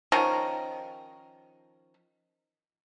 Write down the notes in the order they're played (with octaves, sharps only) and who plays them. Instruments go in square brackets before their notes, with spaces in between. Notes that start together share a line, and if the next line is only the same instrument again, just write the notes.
[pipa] D#3 F3 C#4 A#4